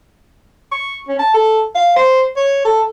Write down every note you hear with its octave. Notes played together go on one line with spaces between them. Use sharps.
C#6
C#4
A5
A4
F5
C5
C#5
A4